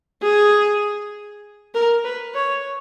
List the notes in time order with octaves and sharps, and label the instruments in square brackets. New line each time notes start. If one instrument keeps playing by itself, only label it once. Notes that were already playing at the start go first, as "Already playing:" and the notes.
[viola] G#4
A#4
B4
C#5